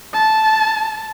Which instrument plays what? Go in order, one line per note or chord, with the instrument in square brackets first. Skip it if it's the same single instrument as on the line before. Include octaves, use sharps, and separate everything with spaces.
[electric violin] A5